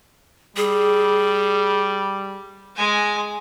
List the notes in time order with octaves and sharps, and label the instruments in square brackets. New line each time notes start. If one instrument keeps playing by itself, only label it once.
[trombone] G3 [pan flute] G#4
[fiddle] G#3 G#5